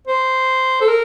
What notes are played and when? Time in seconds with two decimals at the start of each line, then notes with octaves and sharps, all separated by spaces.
0.07 C5
0.81 A4
0.89 A#4